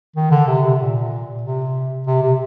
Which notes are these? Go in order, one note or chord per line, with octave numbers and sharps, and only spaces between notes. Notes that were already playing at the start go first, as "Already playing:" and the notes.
D#3
D3
C3
C3
A#2
C3
C3
C3